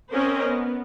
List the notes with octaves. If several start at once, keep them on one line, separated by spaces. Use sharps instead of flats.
C4 C#4 A#4 C5 D#5
B3